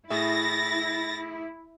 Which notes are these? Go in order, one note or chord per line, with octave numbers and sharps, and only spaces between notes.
A2 E4 G#4 E5 A6 A#6